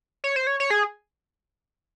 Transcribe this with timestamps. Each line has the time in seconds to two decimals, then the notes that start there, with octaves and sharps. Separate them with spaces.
0.24 C#5
0.36 C5
0.47 C#5
0.60 C#5
0.70 G#4